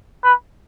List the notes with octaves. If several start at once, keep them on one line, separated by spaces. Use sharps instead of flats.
B4